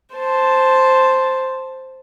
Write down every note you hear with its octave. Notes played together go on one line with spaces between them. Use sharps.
C5 A5